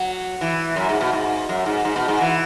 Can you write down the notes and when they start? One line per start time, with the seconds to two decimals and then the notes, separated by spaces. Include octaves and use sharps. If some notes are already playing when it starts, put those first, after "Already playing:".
Already playing: F#3
0.41 E3
0.76 F#2
0.89 G#2
1.01 B2
1.12 G#2
1.49 F#2
1.66 G#2
1.85 G#2
1.96 B2
2.08 G#2
2.20 E3